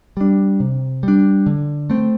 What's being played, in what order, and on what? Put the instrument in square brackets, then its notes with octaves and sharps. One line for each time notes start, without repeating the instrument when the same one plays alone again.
[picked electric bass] G3 D4
C3
G3 D4
D3
A3 C4